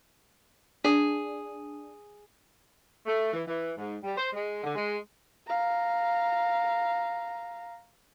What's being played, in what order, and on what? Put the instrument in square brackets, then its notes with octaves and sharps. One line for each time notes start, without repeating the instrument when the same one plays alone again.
[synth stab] D4 [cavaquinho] G#4
[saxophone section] A3
E3
E3
G#2
G3
C5
G#3
D3
G#3
[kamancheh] F5 A#5